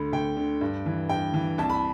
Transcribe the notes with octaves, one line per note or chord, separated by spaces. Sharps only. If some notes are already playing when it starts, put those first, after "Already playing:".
Already playing: D2 D3 B5
D2 G5
D3
G2
E3
G2 G5
E3
C2 A5
B5